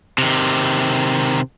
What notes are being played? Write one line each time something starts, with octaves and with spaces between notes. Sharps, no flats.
C3 D#3